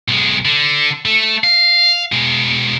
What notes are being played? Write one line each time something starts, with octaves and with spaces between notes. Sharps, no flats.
B1 G#3
D3
A3
F5
B2 G#3